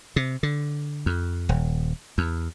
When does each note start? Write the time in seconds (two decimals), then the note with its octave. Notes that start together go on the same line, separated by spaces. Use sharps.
0.16 C3
0.43 D3
1.06 F2
1.49 D#1
2.18 E2